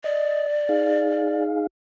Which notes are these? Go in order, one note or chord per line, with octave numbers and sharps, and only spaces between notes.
D5 D#5
D#4 G#4 F5